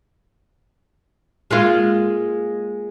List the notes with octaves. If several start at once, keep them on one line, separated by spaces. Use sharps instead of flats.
G#3 A#3 F4